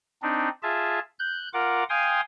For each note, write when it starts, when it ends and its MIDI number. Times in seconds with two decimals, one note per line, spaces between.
0.22 0.49 60
0.22 0.49 62
0.22 0.49 63
0.63 0.99 65
0.63 0.99 68
0.63 0.99 76
0.63 0.99 81
1.19 1.48 90
1.19 1.48 91
1.53 1.84 65
1.53 1.84 70
1.53 1.84 78
1.53 1.84 86
1.89 2.21 77
1.89 2.21 79
1.89 2.21 80
1.89 2.21 84
1.89 2.21 87